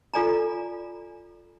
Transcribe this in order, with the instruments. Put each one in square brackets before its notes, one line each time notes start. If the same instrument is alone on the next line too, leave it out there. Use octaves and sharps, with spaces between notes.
[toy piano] F4 A4 D5 G#5 A#5